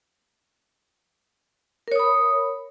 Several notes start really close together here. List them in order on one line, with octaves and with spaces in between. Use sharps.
A#4 C#5 D#6 B5